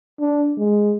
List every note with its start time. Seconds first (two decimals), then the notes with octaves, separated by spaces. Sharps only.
0.20 D4
0.58 G#3